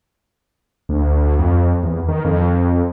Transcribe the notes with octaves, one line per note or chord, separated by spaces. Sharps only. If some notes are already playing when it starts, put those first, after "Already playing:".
D2
F2
E2
D#3
F2